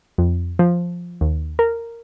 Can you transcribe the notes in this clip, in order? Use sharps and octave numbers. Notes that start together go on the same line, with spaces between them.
F2
F3
D#2
A#4